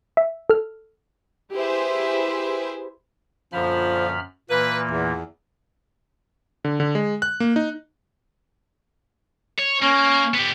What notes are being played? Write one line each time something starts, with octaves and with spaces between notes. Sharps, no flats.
E5
A4 F6
E4 G4 G#4 B4 C5 E5
F#2 A#2 D3 F3 B5 F6
A#2 E3 A#3 B4
E2
D3
D3
G#3
F#6
A#3
D#4
C#5
A#3 C#4
B3 G4